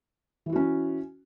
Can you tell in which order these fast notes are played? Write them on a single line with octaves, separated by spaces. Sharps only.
E3 E4 F#4 C#4